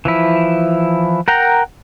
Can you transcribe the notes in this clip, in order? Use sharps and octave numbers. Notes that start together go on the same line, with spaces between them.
E3 F3 E4
A#4 F#5 G5 A#5